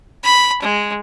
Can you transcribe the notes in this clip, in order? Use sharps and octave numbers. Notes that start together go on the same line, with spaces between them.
B5
G#3